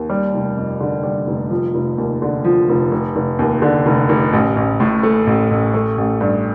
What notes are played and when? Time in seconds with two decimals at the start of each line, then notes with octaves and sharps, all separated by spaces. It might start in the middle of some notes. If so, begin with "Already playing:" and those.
Already playing: D#2
0.10 G3
0.34 F1
0.57 F2
0.80 D3
1.04 G3
1.27 F1
1.50 F3
1.74 F1
1.98 D#2
2.22 D3
2.44 F3
2.69 F1
2.91 F1
3.16 F1
3.39 D#2
3.62 D3
3.86 F1
4.09 F1
4.33 A1
4.56 A1
4.80 A2
5.03 A3
5.27 A1
5.51 A1
5.74 A3
5.98 A1
6.20 G2